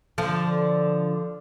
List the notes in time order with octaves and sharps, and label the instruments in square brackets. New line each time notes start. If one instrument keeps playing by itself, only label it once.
[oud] D3 F3